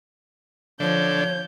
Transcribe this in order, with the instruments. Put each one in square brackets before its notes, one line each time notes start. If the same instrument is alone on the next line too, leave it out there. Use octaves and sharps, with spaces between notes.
[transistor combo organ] D3 [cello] F3 [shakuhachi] C#5 [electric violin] G6